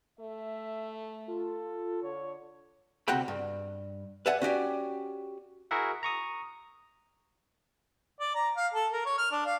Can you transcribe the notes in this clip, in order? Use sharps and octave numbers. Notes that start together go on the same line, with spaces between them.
A3 E5
F4 A4
D3 C#5
D2 C3 F#4 F#5 G5 B5
G2
B4 D5 E5 F#5 G#5
C#4 F#4 G4 D5
E4 F#4 G#4 A#4 E5 F#5
A#5 C#6 D#6
D5
A#5
F5
A4
A#4
C#5
F6
D4
F5